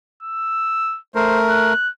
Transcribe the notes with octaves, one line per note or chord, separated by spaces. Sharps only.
E6
A3 A#4 C5
F#6